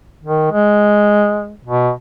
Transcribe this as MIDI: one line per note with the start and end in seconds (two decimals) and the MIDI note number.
0.24 0.49 51
0.52 1.55 56
1.65 1.91 47